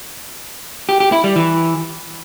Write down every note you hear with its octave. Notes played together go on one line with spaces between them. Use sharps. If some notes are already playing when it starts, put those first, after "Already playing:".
G4
G4
E4
G3
E3